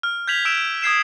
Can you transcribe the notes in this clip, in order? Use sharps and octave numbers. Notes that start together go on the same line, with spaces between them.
F6
G6 G#6 B6 F7 F#7
E6 G6 D7 E7 F7
D#6 G#6 C7 E7